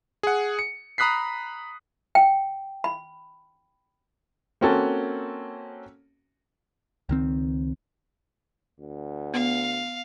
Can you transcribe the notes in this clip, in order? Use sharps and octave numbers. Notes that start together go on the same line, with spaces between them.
G#4 F#5
C#7
A#5 B5 D#6 F#6 B6 C7
G5
B5
A#3 C4 C#4 F#4 A4
C#2 D#3 C4
D2
B3 F5